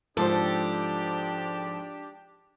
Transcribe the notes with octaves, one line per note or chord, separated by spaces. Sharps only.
G#2 F3 D4 G4 A4 C5